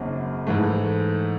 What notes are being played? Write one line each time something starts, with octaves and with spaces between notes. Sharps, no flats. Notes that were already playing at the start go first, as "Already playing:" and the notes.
Already playing: G#1 F#2 C#3 A#3
G#2 E3 A3